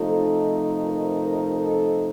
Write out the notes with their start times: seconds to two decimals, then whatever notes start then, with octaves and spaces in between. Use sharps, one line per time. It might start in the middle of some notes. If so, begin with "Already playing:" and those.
Already playing: C3 F3 A3 D#4 A4
0.83 A#4
1.21 A#4
1.58 A4